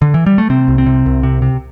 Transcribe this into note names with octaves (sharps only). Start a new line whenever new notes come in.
D3
E3
G3
A3
C3 C4
C2
C4
C3
C2
C3
C3